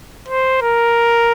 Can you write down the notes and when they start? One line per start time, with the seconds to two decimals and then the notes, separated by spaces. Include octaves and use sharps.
0.28 C5
0.62 A#4